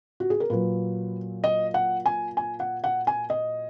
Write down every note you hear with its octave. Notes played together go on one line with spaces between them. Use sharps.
F#4
G#4
A#4
A#2 F#3 B4
D#5
F#5
G#5
G#5
F#5
F#5
G#5
D#5